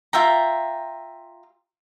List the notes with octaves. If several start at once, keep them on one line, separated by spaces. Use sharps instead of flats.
F4 E5 G5 A#5